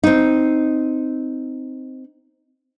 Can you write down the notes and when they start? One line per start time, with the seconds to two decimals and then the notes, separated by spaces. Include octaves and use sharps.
0.03 C4 D#4